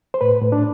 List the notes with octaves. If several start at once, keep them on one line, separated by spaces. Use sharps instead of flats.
C5
A2 B4
A2
D4